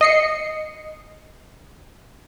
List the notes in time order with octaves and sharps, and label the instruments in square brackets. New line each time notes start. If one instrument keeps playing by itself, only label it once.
[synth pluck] D#5 C7 C#7